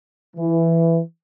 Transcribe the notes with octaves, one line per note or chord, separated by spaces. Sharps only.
E3